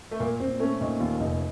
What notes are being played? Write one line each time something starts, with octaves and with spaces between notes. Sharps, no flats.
A3
A#2 A#3
A#2 C4
A3 C#4
A#2 D#4
D#2 F4
F1 D#4